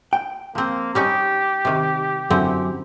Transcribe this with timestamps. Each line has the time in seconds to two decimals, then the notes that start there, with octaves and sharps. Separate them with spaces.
0.13 G5
0.55 F3 A#3 C4
0.95 G3 C#4 D#4 G4
1.65 C3 D#3
2.30 F#2 D3 E3 C4